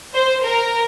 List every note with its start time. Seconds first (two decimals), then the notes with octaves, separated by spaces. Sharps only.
0.14 C5
0.44 A#4